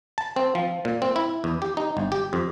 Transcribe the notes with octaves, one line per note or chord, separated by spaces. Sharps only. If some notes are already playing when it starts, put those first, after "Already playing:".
A5
C4
F3
A#2
C4
E4
E2
G4
D#4
G1
G4
F2